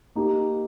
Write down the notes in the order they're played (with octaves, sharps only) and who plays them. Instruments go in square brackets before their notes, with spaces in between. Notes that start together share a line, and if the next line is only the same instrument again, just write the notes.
[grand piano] A#3 D#4 G4